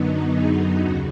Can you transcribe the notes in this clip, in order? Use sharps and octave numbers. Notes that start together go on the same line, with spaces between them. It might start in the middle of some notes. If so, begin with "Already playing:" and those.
Already playing: F#2 D3 F#3 B3 D#4
G#4
D#2 C#3 F#4